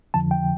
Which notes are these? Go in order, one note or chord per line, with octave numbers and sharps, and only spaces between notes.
F2 D3 F3 A5
G5